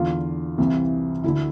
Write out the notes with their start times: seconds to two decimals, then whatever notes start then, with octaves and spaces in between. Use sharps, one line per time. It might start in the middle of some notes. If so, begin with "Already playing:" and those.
Already playing: E2 D3 F4 F5
0.58 C2 C3 E3
1.23 D2 D3 E4 E5